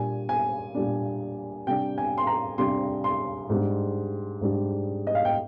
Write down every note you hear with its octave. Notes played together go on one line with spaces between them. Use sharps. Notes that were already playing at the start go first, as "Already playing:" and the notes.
Already playing: A#2 G3 D4 G#5
G#5
A#2 G3 D4
C3 G3 D4 G5
G#5
C6
A#5
C3 G3 D4 C6
C6
G#2 G3 D4
G#2 G3 D4
D#5
F5
G5